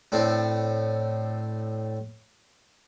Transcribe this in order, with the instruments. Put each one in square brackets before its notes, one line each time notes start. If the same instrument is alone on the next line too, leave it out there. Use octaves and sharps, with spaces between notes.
[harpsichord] A2 A3 C4 D4